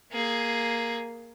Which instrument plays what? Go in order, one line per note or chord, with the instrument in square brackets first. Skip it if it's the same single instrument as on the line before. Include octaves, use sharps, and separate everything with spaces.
[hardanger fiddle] A#3 G#4